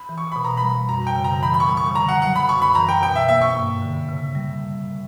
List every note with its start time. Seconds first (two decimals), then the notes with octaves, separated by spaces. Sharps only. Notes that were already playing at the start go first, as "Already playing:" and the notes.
Already playing: B5
0.09 E3
0.18 C#6
0.32 B2 B5
0.44 A#5
0.57 G3 B5
0.89 F#2 A#5
1.07 G5
1.16 C#3
1.24 A#5
1.42 E3 B5
1.54 B5
1.60 C#6
1.69 G3
1.77 C#6
1.95 D3 A#5
2.08 F#5
2.22 F#3 F#5
2.36 B5
2.48 F#2 C#6
2.62 B5
2.75 E3 A#5
2.89 G5
3.02 B2 G5
3.16 E5
3.29 A#3 E5
3.41 C#6
3.55 G2
3.82 D3
4.09 C#3
4.35 G3